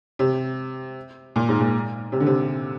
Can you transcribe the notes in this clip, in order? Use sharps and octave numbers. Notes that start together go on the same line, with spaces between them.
C3
A#2
G#2
A#2
C3
D3
C3